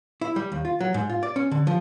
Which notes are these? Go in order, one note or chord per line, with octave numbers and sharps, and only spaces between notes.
E4
G3
D#2
F4
F#3
G#2
F4
D5
C#4
D3
F3